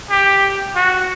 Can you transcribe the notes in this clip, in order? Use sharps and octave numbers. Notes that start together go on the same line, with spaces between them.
G4
F#4